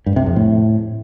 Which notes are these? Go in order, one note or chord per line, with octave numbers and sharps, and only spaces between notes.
G2
C3
F2
A2